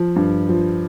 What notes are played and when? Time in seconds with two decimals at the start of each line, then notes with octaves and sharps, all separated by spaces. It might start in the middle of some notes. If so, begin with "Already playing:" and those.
Already playing: F3
0.16 G2
0.49 F3